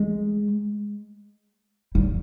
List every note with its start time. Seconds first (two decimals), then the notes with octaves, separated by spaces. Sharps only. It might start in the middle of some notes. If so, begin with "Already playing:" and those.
Already playing: G#3
1.95 G3